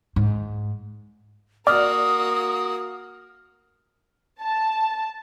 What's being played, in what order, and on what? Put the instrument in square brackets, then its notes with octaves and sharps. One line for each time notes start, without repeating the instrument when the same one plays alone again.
[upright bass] G#2
[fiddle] A#3 F#4 [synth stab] D5 [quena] D#6 [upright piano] F6
[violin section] A5